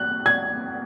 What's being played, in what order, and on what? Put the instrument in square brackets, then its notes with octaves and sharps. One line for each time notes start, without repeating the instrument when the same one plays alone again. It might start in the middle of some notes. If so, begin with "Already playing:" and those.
Already playing: [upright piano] F#6
G#6